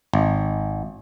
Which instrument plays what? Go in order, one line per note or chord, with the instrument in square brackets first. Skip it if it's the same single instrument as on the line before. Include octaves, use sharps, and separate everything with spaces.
[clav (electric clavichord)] G#1